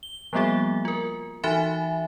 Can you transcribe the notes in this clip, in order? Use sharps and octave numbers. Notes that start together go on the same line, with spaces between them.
G7
F3 G3 A#3 B3 F#4 G#4
F4 A#4
E3 D#4 F#4 E5 G#5 B5